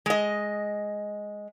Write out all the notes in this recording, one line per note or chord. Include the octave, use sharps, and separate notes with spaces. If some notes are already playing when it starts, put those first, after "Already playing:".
G#3 D#5